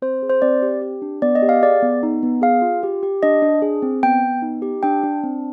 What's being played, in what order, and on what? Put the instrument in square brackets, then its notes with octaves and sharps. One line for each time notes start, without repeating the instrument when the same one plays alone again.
[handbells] C4 C5
G#4
C5
C4 D5
G4
G4
D4
B3 D5
D#5
G4
F5
G#4 D5
B3
D#4
B3
G#4 F5
F4
G4
G4
D4 D#5
D4
G#4
C4
B3 G5
B3
D#4
G4
D4 G5
D4
C4